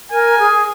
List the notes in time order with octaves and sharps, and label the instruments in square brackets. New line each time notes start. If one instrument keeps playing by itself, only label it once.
[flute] A#4 [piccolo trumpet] G#5
[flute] G#4